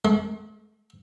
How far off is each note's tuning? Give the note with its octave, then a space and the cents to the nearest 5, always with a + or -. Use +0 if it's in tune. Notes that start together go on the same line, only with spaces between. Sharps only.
A3 -45